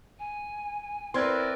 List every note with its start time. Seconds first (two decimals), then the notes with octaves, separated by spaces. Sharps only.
0.19 G#5
1.14 C4 E4 A#4 B4 D5 C6 G#6